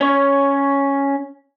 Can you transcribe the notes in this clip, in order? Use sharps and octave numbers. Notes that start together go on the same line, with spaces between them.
C#4 C#5